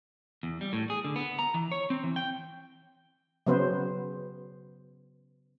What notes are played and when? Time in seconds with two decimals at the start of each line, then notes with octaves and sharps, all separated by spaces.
0.43 E2
0.61 G3
0.73 A2
0.90 G#4
1.05 D3
1.16 B3
1.39 A#5
1.54 E3
1.72 C#5
1.90 C4
2.04 E3
2.16 G5
3.46 C#3 F#3 B3 B4 C5